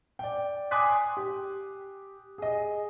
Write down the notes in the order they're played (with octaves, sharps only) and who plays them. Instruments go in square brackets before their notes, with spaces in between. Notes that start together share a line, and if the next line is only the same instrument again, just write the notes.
[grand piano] D5 G5
G#5 C6 D6 D#6 F#6 B6
G4
G#4 D#5